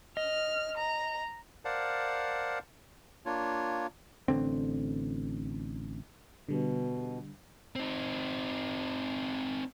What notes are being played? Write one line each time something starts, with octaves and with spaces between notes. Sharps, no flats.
D#5 F6
A#5
A#4 C5 D5 F5 F#5 A5
A#3 D4 F4 C#5
A1 D3 C4
B2 D3 G3
C4 D#4